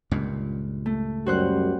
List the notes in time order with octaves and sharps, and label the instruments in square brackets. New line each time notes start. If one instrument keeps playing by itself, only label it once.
[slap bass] C#2 G2 A#2
[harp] A3
[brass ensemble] F#2 G3 [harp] F#4 C5 F#6